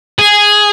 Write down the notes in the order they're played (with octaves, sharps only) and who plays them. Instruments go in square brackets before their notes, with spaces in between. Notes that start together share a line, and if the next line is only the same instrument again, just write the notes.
[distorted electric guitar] G#4